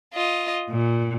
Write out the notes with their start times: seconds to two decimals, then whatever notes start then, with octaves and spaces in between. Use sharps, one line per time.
0.12 F4 D#5
0.69 A#2